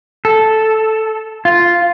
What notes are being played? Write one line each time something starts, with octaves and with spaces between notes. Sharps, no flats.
A4
F4